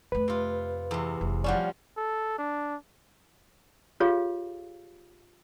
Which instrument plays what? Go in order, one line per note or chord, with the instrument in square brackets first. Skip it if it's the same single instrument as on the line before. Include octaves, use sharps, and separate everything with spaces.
[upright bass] F2 A3 [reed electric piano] B4
[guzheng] C3 F4
E2 C3
[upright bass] F1
[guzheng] F3 G3 C#4 [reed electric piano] D5 F#5
[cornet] A4
D4
[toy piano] F4 G4 G#4 C#5 F5